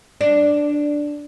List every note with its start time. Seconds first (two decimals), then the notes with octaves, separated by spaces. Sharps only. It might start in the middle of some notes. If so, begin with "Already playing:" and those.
0.21 D4